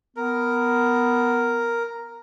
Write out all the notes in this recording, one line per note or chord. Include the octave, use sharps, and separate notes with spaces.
B3 A#4